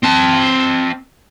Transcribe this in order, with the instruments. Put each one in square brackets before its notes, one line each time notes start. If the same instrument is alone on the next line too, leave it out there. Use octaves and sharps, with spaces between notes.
[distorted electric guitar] C4 A5